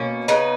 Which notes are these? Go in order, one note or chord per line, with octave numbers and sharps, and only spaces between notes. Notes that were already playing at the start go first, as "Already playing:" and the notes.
Already playing: B2 A#3 C#4
C#3 B3 D#4